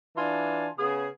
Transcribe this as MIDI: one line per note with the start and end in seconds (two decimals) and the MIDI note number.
0.17 0.67 52
0.17 0.67 62
0.17 0.67 65
0.17 0.67 80
0.17 0.67 81
0.78 1.08 49
0.78 1.08 59
0.78 1.08 68